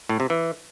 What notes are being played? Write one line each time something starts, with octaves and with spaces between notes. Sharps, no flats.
A2
C3
E3